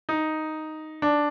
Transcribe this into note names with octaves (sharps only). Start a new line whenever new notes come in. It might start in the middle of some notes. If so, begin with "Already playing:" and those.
D#4
D4